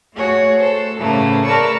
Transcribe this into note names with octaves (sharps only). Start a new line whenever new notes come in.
A3 F#4 G#4 C#5
A4 C5
A2 C#3 E3 A3 A#3
A#4 B4 D5 A5 C#6 E6